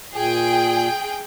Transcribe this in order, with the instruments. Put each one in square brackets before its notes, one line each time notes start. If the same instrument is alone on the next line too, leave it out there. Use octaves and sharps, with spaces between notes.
[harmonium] A#2 [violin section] G#4 G5